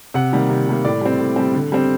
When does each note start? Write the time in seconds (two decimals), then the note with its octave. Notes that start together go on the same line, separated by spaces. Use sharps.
0.14 C3 F#5
0.33 D#3 G3 A#3
0.50 C3
0.67 D#3 G3 A#3
0.85 A2 D5
1.01 G3 C4
1.19 A2
1.36 G3 C4
1.54 D3
1.72 G3 C4